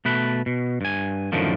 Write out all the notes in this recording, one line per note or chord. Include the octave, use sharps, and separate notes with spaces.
B2 A3 B4
B2
G2 G#5
F#2 A2 D3 D#3 F3